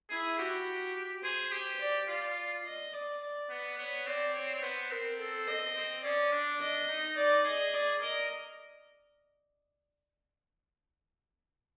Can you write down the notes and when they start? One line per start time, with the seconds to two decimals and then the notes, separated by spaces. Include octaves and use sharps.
0.10 E4 G#4
0.38 F#4 G4
1.23 G#4 C5
1.52 G4
1.79 D5
2.08 F4 D5
2.65 D#5
2.93 D5
3.21 D5
3.50 B3
3.78 B3 C#5
4.06 C4 D5
4.35 C#5
4.62 B3 C5
4.91 C4 A#4
5.19 A4
5.48 D#5
5.76 C4
6.03 C#4 D5
6.32 D4
6.60 D#5
6.89 D#4
7.17 D5
7.45 G#4 D#5
7.74 D5
8.01 A#4 D#5